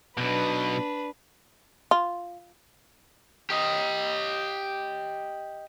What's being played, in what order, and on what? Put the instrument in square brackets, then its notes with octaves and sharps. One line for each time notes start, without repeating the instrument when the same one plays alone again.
[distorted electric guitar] B1 B2 [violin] D4 B4
[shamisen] F4
[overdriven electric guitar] G4 D#5